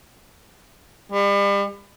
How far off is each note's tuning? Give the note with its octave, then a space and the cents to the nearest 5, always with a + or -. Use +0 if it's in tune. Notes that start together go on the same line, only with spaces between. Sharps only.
G3 +40